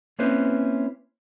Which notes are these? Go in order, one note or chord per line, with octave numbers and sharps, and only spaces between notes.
A#3 C4 C#4 E4 B4 C5